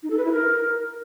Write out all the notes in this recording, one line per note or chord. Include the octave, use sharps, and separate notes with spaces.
D#4
A4
B4
E4
A#4